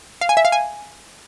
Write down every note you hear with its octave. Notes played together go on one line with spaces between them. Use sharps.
F5
G#5
E5
F5
G#5